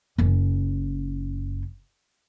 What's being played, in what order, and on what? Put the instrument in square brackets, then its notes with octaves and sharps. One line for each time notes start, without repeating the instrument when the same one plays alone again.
[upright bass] F#1 C#4